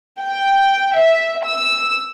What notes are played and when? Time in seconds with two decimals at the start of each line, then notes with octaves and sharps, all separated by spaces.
0.21 G5
0.96 E5
1.45 E6